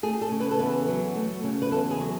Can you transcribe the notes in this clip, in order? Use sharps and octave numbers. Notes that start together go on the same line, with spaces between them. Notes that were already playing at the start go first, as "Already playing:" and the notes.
A3 G#4
A4
C#3
B4
A4
E2 B4
F#3
A3
C#3
B4
E2 A4
G#4
F#3